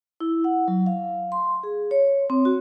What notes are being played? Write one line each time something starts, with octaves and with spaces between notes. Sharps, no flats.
E4
F#5
F#3
F5
C6
G#4
C#5
C4
F#4